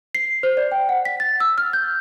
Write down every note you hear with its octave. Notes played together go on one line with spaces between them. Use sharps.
C7
C5
D5
G5
F#5
B6
A6
E6
F6
G6